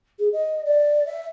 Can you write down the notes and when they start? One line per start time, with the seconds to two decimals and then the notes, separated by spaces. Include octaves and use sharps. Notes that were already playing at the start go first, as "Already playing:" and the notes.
0.19 G#4
0.33 D#5
0.65 D5
1.06 E5